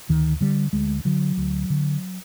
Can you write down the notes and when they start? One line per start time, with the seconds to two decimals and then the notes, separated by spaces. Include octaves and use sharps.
0.09 D2 D#3
0.41 D3 G3
0.73 D2 G#3
1.05 D3 F#3
1.37 D2
1.70 D3